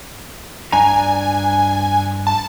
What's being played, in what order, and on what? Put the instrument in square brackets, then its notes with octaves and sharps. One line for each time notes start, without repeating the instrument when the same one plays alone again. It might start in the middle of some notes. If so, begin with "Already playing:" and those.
[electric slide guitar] G2 D4 A#5 [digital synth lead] G#5
[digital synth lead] A5